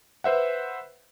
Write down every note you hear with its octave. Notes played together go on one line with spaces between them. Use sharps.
B4 C5 E5 F#5